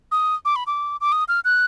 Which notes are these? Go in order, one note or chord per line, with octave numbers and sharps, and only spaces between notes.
D#6
D6
B5
D6
D6
D#6
F6
F#6